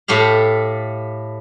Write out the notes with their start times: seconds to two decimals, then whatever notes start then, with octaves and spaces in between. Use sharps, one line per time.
0.08 A2 A3 G4 F5